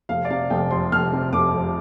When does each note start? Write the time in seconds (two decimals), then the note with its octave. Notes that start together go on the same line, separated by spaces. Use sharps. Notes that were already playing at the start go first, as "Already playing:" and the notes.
0.09 F1 F5
0.25 D5
0.30 C3 F5
0.50 F1 G5
0.71 F2 C6
0.91 F1 F6
1.13 C3
1.32 F1 D6
1.54 F2